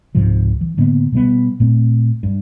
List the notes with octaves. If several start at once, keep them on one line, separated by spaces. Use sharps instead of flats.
C#2 G#2 C3 F3
E3
A2 D3 A#3 B3
B2 G3 G#3 B3
A#2 A3 C4
G2